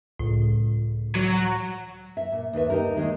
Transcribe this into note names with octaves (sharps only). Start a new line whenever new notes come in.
C#2 A2
F#3
E5
A#2
D#2 D#4 B4 E5
D#4 G4 A#4
D#2 D#3 G#3 D#4